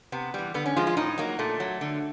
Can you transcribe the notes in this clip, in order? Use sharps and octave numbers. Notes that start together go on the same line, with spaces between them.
C3 B3
E3 G3
D3 B3
C#4
F3 G#3 F4
F4
A2 D#4
F#3 A#3
A#2 A3
F#3
D3